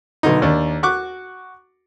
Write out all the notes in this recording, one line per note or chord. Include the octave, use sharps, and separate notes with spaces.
B1 B2 D3 D#4
D#2 D4
F#4 C#6 D6 F#6